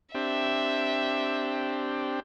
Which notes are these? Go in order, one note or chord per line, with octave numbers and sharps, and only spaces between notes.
C4 D4 G4 E5